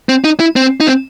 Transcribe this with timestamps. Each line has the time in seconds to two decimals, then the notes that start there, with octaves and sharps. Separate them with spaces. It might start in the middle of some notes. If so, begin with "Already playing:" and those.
0.09 C4
0.24 D#4
0.40 E4
0.56 C4
0.80 D#4
0.87 C4